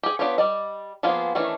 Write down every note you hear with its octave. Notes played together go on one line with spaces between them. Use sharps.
G4 G#4
B3 D4 F4 G4 C#5
G3 D5 D#5
F3 A#3 B3 F4 G#4
D#3 E3 A3 C#4 D4